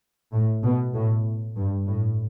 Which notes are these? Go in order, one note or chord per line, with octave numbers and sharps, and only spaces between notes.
A2
B2
A2
G2
A2